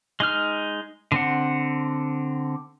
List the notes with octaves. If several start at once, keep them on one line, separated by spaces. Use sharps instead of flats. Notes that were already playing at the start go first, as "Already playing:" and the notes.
G#3 D#4 F6
D3 C4 F#5